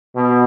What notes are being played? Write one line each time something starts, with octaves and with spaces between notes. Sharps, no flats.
B2